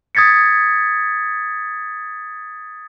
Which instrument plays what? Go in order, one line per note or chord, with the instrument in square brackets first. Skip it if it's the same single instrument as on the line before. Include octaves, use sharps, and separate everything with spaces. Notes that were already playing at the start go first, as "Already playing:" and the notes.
[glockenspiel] D#6 G#6 A6 B6 C#7